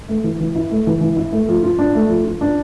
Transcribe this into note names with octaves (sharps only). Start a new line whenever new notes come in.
A3
E3
E3
E4
A3
E3
E3
E4
A3
F3
F4
D4
A3
F3
F4
D4